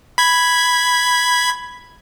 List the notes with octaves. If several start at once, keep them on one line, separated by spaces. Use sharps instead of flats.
B5 G#6